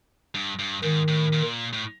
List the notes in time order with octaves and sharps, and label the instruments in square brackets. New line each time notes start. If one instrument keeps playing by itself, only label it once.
[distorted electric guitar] G2
G2
[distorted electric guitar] G#2 [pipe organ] D#3
[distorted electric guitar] A2
A#2
A2